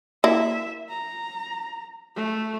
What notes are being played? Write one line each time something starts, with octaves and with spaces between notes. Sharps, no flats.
A#3 E4 E5
A#5
A3